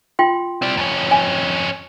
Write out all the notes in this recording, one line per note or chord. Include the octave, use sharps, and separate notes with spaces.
F4 G5 C6
C4 D5
F2 C#4
G#5